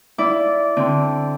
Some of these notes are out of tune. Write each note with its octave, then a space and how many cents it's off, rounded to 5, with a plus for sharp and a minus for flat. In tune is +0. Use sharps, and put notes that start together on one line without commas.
E4 +0 D5 -15 F5 +0
D3 -10 C4 +0